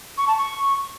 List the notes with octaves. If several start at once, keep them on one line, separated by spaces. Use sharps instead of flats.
C#6
A5
C#6